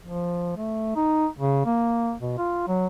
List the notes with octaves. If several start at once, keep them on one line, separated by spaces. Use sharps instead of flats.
F3
A3
D#4
C#3
A#3
B2
F4
F#3